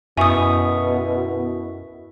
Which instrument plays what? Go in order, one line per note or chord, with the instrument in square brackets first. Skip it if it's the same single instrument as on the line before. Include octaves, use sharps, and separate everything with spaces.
[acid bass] F#2 [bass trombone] B2 [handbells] E4 E5 C#6 [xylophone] G#5 D#6